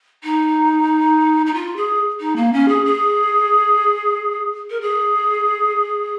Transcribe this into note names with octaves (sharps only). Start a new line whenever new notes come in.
D#4
D#4
F4
G#4
D#4
A#3
C#4
G#4
G#4
A#4
G#4